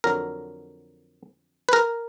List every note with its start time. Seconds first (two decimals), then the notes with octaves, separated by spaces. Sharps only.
0.04 F2 D3 F#3 A#4
1.69 B4
1.73 A#4